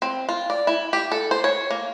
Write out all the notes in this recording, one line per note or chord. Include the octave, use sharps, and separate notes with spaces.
C4
F4
D5
E4
G4
A4
C5
C#5
A#3